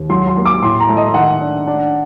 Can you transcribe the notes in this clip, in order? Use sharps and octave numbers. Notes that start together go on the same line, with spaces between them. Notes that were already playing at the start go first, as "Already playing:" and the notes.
Already playing: D#2
F#3 C6
C6
A#3
D6
A2 C6
A#5
A3
D#5
D#3 F#5
D4
D4